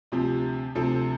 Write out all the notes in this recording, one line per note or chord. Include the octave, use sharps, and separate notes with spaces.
D2 C3 F3 C4 G4
D2 C3 F3 C4 A4